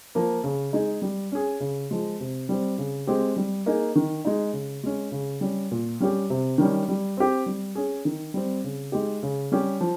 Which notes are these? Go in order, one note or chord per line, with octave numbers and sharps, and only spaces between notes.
F3 A#3
C#3
G#3 D#4 G#4
G3
C#4 G#4
C#3
F3 G#3
C3
G3 C4
C#3
G#3 C4 G4
G3
A#3 D#4 G#4
D#3
G#3 D#4
C#3
G#3 C#4
C#3
G3 C#4
A#2
G3 C#4 G4
C3
D#3 G3 C#4
G3
C4 G4
G3
C#4 G#4
D#3
G3 C4
C#3
G#3 D#4 G4
C#3
G3 C#4 G4
F3